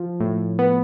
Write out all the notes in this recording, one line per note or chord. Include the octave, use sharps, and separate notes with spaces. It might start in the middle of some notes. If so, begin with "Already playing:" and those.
Already playing: F3
A2
B3